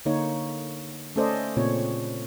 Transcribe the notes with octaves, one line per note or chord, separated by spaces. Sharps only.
D3 A#3 D#4 C#5
A3 C#4 A4 C5 D5 D#5
A#2 C#3 C4 C#5